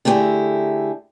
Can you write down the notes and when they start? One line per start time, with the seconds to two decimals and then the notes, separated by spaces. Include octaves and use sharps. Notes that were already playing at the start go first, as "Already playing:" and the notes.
0.05 D3 A3 E4 G4 G#4